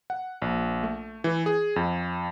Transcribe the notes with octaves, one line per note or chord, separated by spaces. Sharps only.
F#5
A#1
A3
E3
G#4
F2